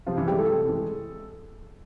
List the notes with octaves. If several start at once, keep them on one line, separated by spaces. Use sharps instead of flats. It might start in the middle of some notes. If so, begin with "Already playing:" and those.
C3 F3 F4
E3 E4
E3 G3 G#3 G4
A3 A4
C3
E3 G#3